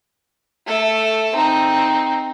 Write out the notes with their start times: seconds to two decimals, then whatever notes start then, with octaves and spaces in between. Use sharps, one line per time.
0.66 A3 A4
1.35 C4 D#4